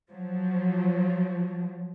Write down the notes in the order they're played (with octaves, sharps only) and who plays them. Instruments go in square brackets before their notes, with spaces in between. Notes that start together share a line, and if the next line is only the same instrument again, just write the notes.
[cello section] F3 F#3